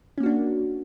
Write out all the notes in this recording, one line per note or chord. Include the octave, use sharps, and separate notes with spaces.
A#3 C#4 D4 F#4